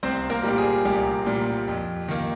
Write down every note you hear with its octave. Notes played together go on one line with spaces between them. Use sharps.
C2 C4 C5
A#3 A#4
A#2 G3 G4
G#4
C2 G4
A#2 G3
F2
D#3 A#3